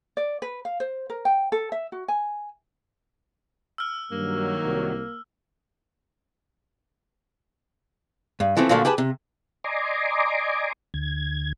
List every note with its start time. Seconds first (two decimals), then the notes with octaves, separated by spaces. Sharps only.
0.17 D5
0.42 B4
0.65 F5
0.80 C5
1.10 A#4
1.25 G5
1.52 A4
1.72 E5
1.92 F#4
2.08 G#5
3.78 E6 F6
4.11 G2 D#3 F#3 A#3
4.65 C2
8.40 G2
8.57 E3 F3 A3 C4
8.69 A#2 D3 F3 F#3 A3 A#3
8.85 G4 G#4 B4 A5
8.98 C3
9.64 D5 D#5 G#5 A#5 C6 D6
10.94 D2 G#6